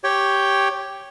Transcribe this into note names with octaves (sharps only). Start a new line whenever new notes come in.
G4 C#5 G5